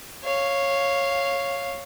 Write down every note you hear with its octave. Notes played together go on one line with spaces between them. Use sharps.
C#5 F5